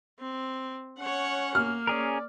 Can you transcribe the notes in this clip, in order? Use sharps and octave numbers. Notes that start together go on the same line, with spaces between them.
C4
C#4 C#5 F#5
A#3 F6
C#4 G#4 A#4 D5